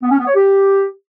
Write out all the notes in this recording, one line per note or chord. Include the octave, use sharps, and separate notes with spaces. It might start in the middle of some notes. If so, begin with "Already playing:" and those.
B3
C#4
B3
C#5
G4